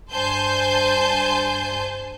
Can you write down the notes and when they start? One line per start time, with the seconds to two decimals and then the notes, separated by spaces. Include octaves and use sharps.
0.12 G2 C5 G#5 A5 G6